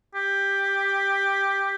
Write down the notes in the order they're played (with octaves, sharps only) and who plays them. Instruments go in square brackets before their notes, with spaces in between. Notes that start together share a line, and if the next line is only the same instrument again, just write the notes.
[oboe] G4